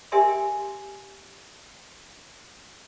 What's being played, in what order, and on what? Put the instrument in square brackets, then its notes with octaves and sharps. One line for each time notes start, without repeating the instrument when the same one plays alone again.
[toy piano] G4 A#4 E5 G5 G#5 C6